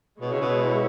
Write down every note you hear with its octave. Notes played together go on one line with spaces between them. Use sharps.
B2 G#3 E4 C#5
C#3
B2